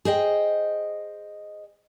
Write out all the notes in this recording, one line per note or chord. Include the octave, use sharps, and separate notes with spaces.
G#4 C5 D#5 G5